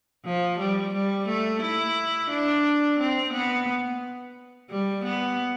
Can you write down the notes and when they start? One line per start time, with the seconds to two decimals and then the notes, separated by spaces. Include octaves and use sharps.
0.25 F3
0.59 G3
0.93 G3
1.27 A3
1.61 E4
2.30 D4
2.99 C4
3.32 B3
4.70 G3
5.04 B3